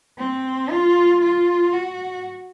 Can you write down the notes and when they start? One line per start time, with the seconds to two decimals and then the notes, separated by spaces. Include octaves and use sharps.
0.18 C4
0.70 F4
1.21 F4
1.73 F#4